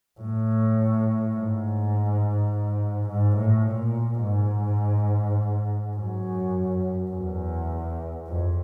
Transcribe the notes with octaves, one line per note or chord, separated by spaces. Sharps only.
A2
G#2
G#2
A2
A#2
G#2
F#2
E2
F2